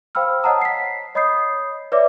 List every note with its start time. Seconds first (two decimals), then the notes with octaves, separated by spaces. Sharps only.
0.15 C5 F5 G5 B5 E6 F6
0.43 C#5 D#5 F#5 A5 A#5 D#6
0.62 B6 C7
1.15 C#5 D#5 B5 D#6 G6 C7
1.92 B4 C#5 D5 E5 D6